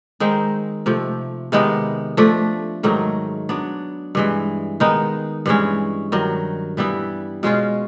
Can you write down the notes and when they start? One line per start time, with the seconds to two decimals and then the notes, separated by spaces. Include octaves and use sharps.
0.20 D#3 G#3 C4 D#4
0.86 C3 F3 A3
1.52 C3 D#3 G#3 B3
2.17 F3 A3 D4
2.83 G#2 D#3 F#3 A3
3.49 F#3 B3 D4
4.15 G2 E3 G#3
4.80 D#3 G#3 B3 D#4
5.46 G2 E3 G#3 C#4
6.12 G2 D#3 F#3
6.77 E3 G3 B3 E4
7.43 B2 G#3 C#4 F4